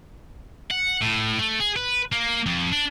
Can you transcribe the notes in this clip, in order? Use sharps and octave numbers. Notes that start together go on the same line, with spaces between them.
F#5
A2
A3
G#4
B4
A#3
F2
D4